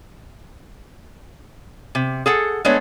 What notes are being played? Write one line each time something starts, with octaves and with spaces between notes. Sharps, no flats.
C3
G#4 A4 F#5
G#3 A3 B3 D4 C#5